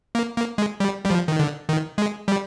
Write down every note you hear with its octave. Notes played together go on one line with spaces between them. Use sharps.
A#3
A#3
G#3
G3
G3
F3
D#3
D3
D#3
G#3
G3